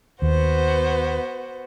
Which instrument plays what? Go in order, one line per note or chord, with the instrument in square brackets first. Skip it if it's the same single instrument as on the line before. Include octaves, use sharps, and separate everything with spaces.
[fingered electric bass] D#2 [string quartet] B3 F#4 C5